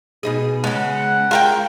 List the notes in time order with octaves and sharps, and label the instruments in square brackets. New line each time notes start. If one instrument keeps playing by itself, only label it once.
[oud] B2 D#4 G#4
[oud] C#3 G#3 [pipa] B3 [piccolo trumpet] F#5
[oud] G#3 [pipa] F4 A#4 G5